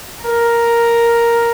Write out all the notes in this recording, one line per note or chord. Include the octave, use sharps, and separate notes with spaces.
A#4